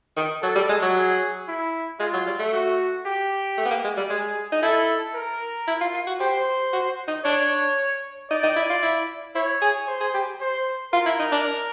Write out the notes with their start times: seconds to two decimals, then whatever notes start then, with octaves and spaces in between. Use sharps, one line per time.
0.16 D#3
0.42 F#3 A4
0.55 G3
0.69 G#3
0.82 F#3
0.96 G#4
1.48 E4
1.99 G#3 F4
2.13 F#3
2.27 G3
2.39 A3
2.53 F#4
3.06 G4
3.58 A3
3.65 B3
3.71 A#3
3.84 G#3
3.97 G3
4.09 G#3 G#4
4.52 D#4
4.62 E4 A4
5.15 A#4
5.67 E4
5.81 F4
5.94 F4
6.07 F#4
6.20 G4 C5
6.73 F#4
7.08 D#4
7.25 D4 C#5
8.30 D#4 D5
8.43 D#4
8.56 E4
8.69 F4
8.82 E4
9.35 E4 C#5
9.61 G#4
9.87 C5
10.00 G#4
10.14 G4
10.41 C5
10.93 F4 A#4
11.06 E4
11.19 D#4
11.32 D4